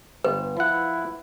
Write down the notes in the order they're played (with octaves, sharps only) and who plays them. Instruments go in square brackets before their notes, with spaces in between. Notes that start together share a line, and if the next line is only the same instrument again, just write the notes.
[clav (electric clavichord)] G1 [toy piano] B4
[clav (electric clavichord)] F3 F#5 [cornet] E4